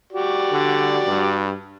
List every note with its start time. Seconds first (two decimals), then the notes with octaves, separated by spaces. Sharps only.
0.13 F#4 G4 D5
0.52 D3
1.07 G2